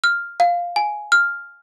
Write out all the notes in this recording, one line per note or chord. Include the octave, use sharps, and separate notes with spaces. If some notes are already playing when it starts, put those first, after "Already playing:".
F6
F5
G#5
F6